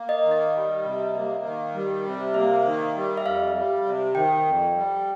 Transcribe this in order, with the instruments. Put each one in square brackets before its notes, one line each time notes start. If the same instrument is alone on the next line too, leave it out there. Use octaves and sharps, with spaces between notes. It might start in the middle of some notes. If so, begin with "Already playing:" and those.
Already playing: [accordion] A#3
[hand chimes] D#5
[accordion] D#3
[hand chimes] D#5
[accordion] G3
C3
A#3
D#3
G3
C3
[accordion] A#3 [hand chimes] E5
[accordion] D#3
G3
[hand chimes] E5
[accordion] F2 [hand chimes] F5
[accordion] G3
C3
[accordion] D#3 [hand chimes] G5
[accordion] F2
G3